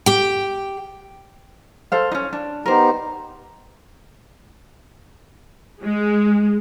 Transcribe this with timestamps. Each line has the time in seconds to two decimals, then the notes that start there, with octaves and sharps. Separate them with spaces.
0.06 G4 G5
1.92 A4 C5 F5
2.11 C#4 D#4
2.33 D4
2.66 B3 D#4 G4 A#4 C5
5.81 G#3